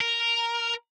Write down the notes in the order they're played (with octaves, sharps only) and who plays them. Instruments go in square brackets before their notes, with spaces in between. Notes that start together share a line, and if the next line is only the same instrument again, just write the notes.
[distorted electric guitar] A#4